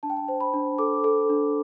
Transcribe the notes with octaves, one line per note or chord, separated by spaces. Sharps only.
D4 A5
G5
A5
C5
B5
D4
A4 D6
A4
D4